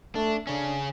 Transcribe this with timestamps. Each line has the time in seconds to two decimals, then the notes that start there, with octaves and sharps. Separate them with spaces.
0.15 A3 D4
0.47 C#3 C#4 D4